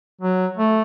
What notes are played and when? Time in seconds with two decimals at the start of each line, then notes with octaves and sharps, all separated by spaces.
0.21 F#3
0.58 A3